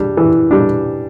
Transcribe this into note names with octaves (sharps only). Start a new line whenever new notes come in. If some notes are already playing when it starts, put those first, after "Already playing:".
Already playing: G3 D4
E3
G3 D4